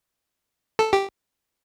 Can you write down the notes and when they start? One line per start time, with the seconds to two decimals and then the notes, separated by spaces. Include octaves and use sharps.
0.79 A4
0.93 G4